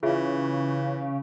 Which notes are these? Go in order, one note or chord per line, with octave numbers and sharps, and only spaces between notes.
C#3 E3 F4 G#4 E5